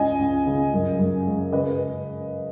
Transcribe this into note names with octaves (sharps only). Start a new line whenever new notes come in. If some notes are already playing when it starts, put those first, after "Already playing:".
Already playing: C#2 D#5 G#5
C#2
C#3
F#2
F#2
G#3
C#3 B4 D#5